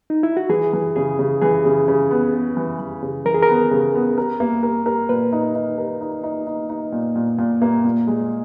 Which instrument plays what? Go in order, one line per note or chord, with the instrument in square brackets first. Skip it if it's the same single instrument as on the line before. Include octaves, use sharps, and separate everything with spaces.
[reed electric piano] D#4
E4
F#4
[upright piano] E3 [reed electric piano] G#4
[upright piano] E3
[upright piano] C#3 [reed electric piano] G#4
[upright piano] C#3
[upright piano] E3 [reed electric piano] G#4
[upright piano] C#3
C#3
B3
B3
E3
E3
C#3
[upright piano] E3 [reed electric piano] A#4
[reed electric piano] G#4
A#4
[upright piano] B3
C#3
B3
A#4
A#3
A#4
A#4
[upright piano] A#2 [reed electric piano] B4
[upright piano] D#4
D#4
A#4
D#4
D#4
D#4
D#4
A#2
A#2
A#2
A#3
A#2
G#3